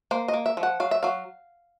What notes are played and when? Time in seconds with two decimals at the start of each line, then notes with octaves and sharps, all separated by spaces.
0.11 A#3 C5
0.28 D#5
0.34 A#3
0.46 E5
0.57 F3
0.63 F#5
0.80 F#3 F5
0.91 E5
1.03 F#3 F5